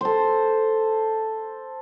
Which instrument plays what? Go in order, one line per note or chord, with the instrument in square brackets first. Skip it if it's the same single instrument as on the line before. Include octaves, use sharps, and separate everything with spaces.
[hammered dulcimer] A4 C5